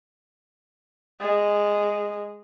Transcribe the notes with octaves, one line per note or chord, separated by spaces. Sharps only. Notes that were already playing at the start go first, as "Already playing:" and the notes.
G#3